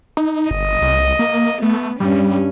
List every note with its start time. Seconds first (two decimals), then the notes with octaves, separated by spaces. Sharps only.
0.17 D#4
0.51 G1 D#5
0.82 C2
1.19 A#3
1.62 A3 B3
2.00 G2 G3 C#4